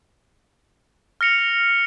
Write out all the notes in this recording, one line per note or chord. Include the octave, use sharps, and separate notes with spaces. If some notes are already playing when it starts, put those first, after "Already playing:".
F6 A#6 C#7 F7